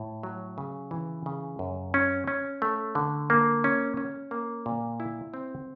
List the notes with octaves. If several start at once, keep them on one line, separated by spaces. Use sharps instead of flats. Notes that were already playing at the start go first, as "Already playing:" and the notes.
Already playing: A2
F#3
C#3
E3
C#3
F#2
C#4
C#4
A3
D3
A#3
C#4
C#4
A#3
A#2
E4
C4